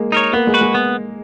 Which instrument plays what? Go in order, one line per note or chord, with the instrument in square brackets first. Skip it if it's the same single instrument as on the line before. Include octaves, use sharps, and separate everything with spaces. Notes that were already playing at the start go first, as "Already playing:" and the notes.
Already playing: [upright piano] G#3 A#3
[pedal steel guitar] D#4 A#4 C#5
[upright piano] A#3 [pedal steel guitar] B3
[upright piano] G#3
[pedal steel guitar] F#4 B4
[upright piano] G#3
[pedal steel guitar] B3